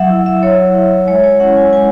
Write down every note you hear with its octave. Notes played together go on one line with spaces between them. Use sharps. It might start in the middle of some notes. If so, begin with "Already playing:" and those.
Already playing: F#3 E5 F#5
E4
E5
F#3 C#5
E4
G#3 C#5
C#5
C#4 E4 F#5
G#5
G#3 G#5